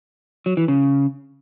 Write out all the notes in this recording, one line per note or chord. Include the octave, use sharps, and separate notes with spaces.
F#3
E3
C#3